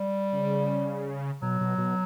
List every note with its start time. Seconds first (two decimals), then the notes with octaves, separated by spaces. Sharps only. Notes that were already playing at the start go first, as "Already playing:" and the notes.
Already playing: G3
0.33 C#3
1.42 B2 F#3
1.61 B2
1.78 B2